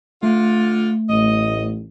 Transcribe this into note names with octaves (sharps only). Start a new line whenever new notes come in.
D3 A3 F4
A1 D#5